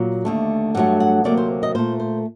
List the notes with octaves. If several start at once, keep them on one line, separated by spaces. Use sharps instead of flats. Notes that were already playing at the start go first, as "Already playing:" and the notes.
Already playing: A#2 F#3
D#2 D3 A3
G2 F#3 A3 F#5
F#5
D2 C3 F#3 A#3 D5
C5
D#5
A#2 A3 C5
C5